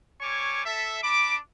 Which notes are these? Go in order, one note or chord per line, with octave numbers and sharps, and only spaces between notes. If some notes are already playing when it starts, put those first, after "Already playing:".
G3 C#5 G#5 C#6 D6
A4 E5
D4 B5 D6